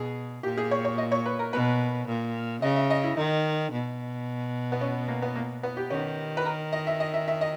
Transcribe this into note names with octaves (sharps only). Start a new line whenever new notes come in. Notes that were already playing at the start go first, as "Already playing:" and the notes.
Already playing: B2 G#4
A#2 G4
G#4
C#5
C#5
D#5
C#5
B4
A#4
B2 B4
A#2
C#3 D#5
E5
D#5
E4
D#3 D#4
B2
B3
C#4
A#3
B3
A#3
B3
G4
D#3 C#4
B4
A#4
D#5
E5
D#5
E5
E5
D#5